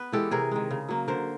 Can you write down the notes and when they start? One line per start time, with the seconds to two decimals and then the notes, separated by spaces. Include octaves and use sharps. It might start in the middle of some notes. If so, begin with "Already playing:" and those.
Already playing: B3 B4
0.12 E3 G#3 G4 A4
0.31 C3 G#4 A#4
0.51 D#3 G#3
0.71 C#3
0.88 F#3 A#3
1.08 D3 A#4 C5